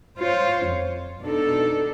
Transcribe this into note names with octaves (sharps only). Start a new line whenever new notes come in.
F4 C5 C#5
F2
B2 D4 D#4 A4